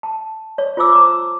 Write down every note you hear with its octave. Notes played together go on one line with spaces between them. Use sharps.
A5
C#5
F4 C5 A5 D6 E6
A#5 D6